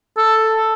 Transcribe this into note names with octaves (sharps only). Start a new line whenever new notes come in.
A4